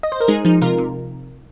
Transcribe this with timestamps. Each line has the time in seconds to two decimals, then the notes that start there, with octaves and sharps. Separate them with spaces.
0.03 D#5
0.12 C5
0.20 A#4
0.28 G#3 D#4 G#4
0.45 F3 D#4
0.62 C3 F4 A#4
0.78 C3